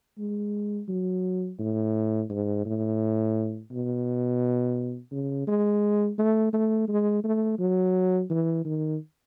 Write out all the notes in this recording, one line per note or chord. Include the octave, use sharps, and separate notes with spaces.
G#3
F#3
A2
G#2
A2
B2
C#3
G#3
A3
A3
G#3
A3
F#3
E3
D#3